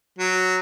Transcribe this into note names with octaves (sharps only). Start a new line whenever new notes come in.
F#3